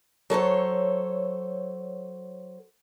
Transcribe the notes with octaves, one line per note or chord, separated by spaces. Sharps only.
F#3 A4 C5 C#5